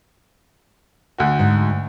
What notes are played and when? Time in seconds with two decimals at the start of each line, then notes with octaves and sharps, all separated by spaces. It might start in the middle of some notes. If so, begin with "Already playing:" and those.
1.18 D2 F#4
1.39 G#2